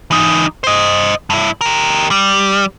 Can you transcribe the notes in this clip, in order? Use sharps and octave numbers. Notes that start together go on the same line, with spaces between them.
E3 D#4
C5 D#5
G2 E4
G4 A#4
G3